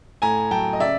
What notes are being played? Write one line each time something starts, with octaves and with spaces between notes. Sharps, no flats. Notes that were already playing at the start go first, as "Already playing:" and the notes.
A2 G#5 A#5
F#3 G5 A5
D#5
C#3 D5 E5